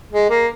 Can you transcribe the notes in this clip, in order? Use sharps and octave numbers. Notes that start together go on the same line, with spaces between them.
G#3
A#3